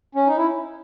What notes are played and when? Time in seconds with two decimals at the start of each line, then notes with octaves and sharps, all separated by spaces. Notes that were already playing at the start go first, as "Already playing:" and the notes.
0.15 C#4
0.27 D#4
0.37 E4